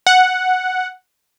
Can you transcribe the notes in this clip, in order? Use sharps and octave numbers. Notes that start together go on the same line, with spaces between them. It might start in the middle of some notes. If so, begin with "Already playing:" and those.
F#5